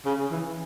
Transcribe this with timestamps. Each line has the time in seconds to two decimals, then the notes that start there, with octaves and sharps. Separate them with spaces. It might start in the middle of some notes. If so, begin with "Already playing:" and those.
0.05 C#3
0.31 E3